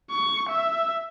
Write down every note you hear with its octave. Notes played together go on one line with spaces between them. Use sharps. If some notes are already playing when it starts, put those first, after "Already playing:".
C#6
E5